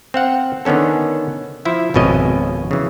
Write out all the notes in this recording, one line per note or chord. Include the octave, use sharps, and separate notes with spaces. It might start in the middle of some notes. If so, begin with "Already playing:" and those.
C4 F5 F#5
D3 D#3 B3 C#4 A4
F3 E4 C5 E5
G#1 F2 B2 C#4 D#5
C#3 E3